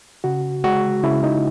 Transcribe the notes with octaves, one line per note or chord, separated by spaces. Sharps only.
C#3 F#4
G#3 F#4
C#3 E4
D#4